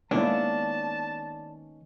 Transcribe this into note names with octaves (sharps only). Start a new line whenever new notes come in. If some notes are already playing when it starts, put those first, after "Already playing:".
D#3 G#3 A#3 B3 C#4 D4 E4 A5